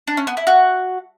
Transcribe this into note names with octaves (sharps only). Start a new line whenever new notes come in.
D4
C#4
B3
E4
F#4